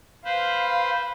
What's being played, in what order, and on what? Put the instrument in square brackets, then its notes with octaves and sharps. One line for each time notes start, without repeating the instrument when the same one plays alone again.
[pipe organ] B4 C5 [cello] F5